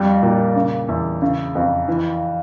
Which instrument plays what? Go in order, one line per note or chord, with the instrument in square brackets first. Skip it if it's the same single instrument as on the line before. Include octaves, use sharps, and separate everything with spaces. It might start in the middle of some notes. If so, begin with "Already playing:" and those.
Already playing: [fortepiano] F2 G3
A#2
C#3
E2
C#3
F2
E3